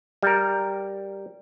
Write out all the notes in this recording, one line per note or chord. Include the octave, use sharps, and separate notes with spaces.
G3 A#4